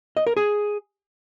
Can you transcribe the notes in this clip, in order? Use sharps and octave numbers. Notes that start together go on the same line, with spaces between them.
D#5
A#4
G#4